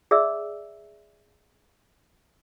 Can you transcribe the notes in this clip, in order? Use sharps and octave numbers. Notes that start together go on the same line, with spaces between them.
G#4 D5 E5 E6